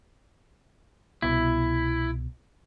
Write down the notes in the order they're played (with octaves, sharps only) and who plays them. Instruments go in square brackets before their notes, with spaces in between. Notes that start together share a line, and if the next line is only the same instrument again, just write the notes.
[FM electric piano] C2 B2 [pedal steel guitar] E4